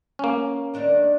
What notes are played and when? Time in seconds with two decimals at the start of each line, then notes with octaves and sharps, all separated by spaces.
0.19 A#3 C#4
0.74 D#3 D4 D#4